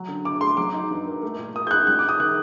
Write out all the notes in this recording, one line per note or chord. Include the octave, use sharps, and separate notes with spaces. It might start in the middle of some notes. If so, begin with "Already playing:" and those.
Already playing: F#3
D3
D3 D6
A3 C6
F#3 D6
D#4
G2
A#3
A3
A#2
A#2 D#6
G6
D#4 F#6
G3 F#6
D6
D#4 D#6
D#3 F#6